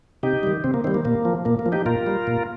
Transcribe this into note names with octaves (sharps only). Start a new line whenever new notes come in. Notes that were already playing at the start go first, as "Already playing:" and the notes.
C3 D#4 G4
D#3 G3
C3 C4
A#3
D#3 G3 C4
A#3
A#2 A#3
F3
A#2 A#3
A#3
F3
D#4 G4
A#2 F4 A#4
G3
A#2